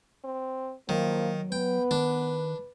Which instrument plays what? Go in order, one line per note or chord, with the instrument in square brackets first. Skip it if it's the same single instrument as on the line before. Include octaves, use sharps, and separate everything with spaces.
[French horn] C4
[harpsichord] D#3 [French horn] F3 [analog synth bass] F#3 [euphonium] A#3
[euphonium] B3 [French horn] B4 [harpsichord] G5
[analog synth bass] D#3 [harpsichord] D4